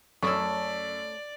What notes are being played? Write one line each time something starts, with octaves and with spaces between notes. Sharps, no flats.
F#2 A3 C#4 A4 D5 C#6 E6